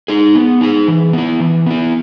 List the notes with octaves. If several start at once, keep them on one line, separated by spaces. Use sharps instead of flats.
D#4 G#4
B3
D#4 G#4
E3
B3 E4
E3
B3 E4